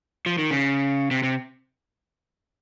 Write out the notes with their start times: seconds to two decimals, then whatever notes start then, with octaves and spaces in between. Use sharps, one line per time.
0.26 F3
0.38 D#3
0.51 C#3
1.11 C3
1.23 C3